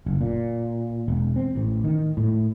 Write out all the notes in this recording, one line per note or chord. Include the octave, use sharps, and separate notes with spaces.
F#1
A#2
E1
C4
A1
D#3
A2